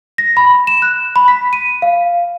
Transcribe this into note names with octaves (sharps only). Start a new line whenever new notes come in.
A#6
B5
E7
F#6
B5
B6
D#7
F5